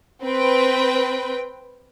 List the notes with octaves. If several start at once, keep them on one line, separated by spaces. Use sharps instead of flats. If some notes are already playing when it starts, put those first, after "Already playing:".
C4 B4 G5